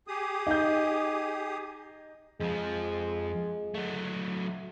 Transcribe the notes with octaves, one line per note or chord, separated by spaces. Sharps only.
G4 G#4 D#6
D#4 G6
F2 F3 G#3
F#3 A3